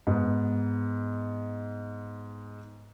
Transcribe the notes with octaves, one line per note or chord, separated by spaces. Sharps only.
G#2 B3